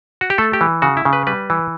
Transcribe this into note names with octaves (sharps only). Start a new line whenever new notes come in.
F#4
G4
A3 A4
G4
E3
C#3 F#4
E4
C#3
B4
G3 B4
E3